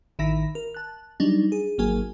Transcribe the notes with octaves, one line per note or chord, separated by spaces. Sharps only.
A1 D#3 E5 B5 A#6
A#4
A5 F#6
F#3 G3 D4 D#4
G#4
G#1 F#3 A#3 G#4 G#5